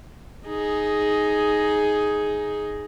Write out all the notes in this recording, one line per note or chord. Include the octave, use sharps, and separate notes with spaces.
D#4 G#4